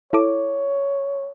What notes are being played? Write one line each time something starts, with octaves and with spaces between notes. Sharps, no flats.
E4 A4 C#5 D6